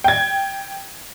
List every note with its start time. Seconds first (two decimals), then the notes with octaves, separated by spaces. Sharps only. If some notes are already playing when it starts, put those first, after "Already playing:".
0.04 G5 G#6